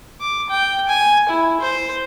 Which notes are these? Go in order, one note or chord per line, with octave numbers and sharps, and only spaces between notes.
D6
G5
G#5
E4
C5